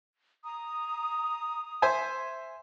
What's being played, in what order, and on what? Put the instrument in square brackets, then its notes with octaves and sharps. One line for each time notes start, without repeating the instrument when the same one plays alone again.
[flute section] A#5 D#6
[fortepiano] C5 E5 G#5